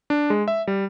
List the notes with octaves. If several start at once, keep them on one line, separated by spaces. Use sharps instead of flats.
D4
G#3
E5
G3